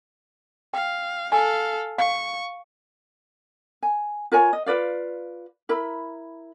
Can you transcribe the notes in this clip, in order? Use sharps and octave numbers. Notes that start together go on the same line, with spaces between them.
F5 G5
A4 F5 G#5
F5 C#6
G#5
F4 A#4 C#5 G#5
D#5
F4 B4 D5 F5
E4 A#4 B5